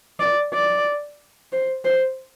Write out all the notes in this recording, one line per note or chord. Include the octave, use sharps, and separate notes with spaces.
D5
D5
C5
C5